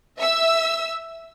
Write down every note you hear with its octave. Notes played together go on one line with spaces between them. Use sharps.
E5 E6